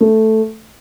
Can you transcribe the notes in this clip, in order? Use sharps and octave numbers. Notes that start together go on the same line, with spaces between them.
A3